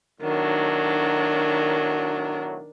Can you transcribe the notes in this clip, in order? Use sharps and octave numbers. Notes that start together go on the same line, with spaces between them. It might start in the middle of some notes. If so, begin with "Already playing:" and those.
B1 A2 D#3 F#3 D4